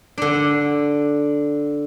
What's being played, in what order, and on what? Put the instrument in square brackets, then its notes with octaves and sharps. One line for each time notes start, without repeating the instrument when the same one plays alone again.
[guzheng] D3 D4